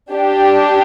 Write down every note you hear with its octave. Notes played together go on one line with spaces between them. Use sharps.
D4 G4